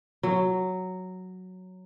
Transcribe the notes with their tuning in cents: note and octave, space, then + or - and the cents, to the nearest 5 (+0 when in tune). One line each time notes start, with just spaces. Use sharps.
F#3 +0